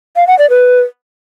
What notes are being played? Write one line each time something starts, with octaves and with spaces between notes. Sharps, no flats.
F5
F#5
D5
B4